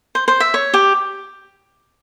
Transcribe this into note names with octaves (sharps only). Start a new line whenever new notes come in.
C5
C5
E5
C#5
G4